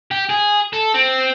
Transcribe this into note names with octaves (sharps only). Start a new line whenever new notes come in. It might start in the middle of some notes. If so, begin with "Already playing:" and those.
G4
G#4
A4
C4